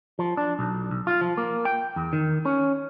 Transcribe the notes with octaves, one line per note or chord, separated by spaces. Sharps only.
F3
D4
B1
B1
F4
F3
A#3
G5
E2
D#3
C#4